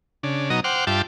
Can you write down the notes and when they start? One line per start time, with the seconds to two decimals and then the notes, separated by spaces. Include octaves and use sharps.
0.23 C#3 D4
0.50 B2 F#3 D#4 D#5 A#5
0.64 C5 F#5 G5 D6 F6
0.87 G2 F4 E5 G5 A5 D6